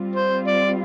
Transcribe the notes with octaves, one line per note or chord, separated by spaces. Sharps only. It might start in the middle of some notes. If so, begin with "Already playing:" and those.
Already playing: G3 C4 F4
C5
D5